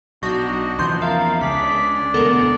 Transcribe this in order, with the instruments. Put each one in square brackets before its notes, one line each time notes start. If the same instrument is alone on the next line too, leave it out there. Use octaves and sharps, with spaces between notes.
[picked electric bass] B1 [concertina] D4 D#5 [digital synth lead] F#4 [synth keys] G6 A#6
[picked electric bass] E2 C#3 F3 [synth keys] B3 C6 G6
[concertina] A#4 A5 [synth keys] E5 [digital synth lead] F5
[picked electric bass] C#2 [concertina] D4 G#4 D5 [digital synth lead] B6
[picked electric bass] E1 D2 [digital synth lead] B3 [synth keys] A4 A#4